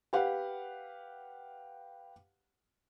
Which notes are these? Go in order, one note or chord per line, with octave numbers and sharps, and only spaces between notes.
G4 B4 F5 F#5